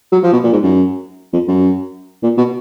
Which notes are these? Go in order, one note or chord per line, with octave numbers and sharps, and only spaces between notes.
F#3
F3
B2
A#2
G#2
F#2
F2
F#2
A#2
B2